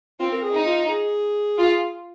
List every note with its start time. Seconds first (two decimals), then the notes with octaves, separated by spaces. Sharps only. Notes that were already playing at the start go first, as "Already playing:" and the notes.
0.20 C4 F4
0.32 A#4
0.43 G#4
0.54 D#4
0.66 F4
0.89 G#4
1.58 F4